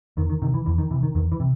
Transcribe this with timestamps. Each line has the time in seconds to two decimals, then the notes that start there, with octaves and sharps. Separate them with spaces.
0.17 E2 D#3
0.30 D#3
0.42 C3 D#3
0.54 E3
0.66 E2 E3
0.78 D#3
0.91 C3 E3
1.03 D#3
1.15 E2 D#3
1.32 E3
1.40 C3